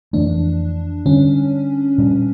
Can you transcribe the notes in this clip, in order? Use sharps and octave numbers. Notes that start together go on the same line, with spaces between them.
F2 E3 A3 D4
D3 G3 C#4 D4
A#2 G3 D4